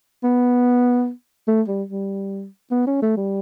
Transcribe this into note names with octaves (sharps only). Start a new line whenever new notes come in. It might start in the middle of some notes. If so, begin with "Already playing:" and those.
B3
A3
G3
G3
B3
C#4
A3
G3